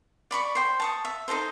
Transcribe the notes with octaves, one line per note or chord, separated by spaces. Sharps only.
D5 B5 C#6 D6
C5 G5
A5 C#6 D#6
E5
D#4 G4 A4 C5